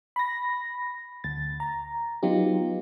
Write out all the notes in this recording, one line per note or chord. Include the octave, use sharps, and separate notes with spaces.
B5 A#6
D2 A6
A#5
F#3 B3 D#4 F4 G4